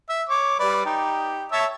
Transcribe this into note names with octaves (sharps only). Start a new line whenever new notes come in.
E5
C#5 D6
G3 B4 D5
D#4 G4
C#5 E5 A5